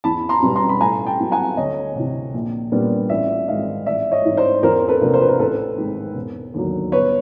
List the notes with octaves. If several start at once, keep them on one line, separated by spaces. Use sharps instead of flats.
E2 A5 B5
A#5 C6
B2 G3 B3
A#5 C6
B5
A2 G#5 A#5
G5 A5
F#3 B3 E4
F#5 G#5
D2 C#5 D#5
C3 E3
A#1
A#2 G3 B3 D4
A1 D5 E5
G#2 D#3 G#3 C4 D#5 F5
A1 D5 E5
C#5 D#5
G#2 E3
C5 D5
E2 A#4 C5
A4 B4
C3 F3 A#3 D4
C5
B4
A#4 C5
A1 A4 B4
G#2 D#3 G#3 C4
E1
D#2 D3 F#3
G1 B4 C#5